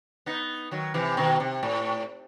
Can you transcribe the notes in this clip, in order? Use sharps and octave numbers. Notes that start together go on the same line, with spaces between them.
B3 D#4
D#3 F#3
C3 E3
B2 D#3
C3
A2